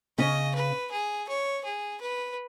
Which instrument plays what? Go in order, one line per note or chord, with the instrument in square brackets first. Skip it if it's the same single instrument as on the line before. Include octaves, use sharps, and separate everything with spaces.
[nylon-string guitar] C#3 C#4 [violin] D#5
[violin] B4
G#4
C#5
G#4
B4